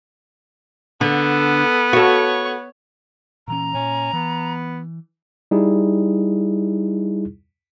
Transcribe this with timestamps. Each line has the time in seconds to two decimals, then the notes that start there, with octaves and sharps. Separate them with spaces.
1.01 D3 B3 A4
1.93 F#4 A4 C#5 C#6
3.48 A#2 E3 C#4 A#5
3.74 A#2 C#4
4.13 E3 B3
5.51 G3 D#4 E4 G#4